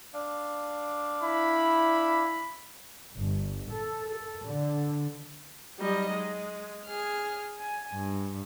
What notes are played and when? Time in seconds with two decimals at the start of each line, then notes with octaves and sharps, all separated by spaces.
0.14 D4 D5 F5
1.23 E4 B5
3.13 G1
3.68 A4
4.07 A4
4.44 D3
5.78 F#3 G3 D#4 D#5
6.12 G#3
6.86 G#4 F6
7.60 G#5
7.94 G2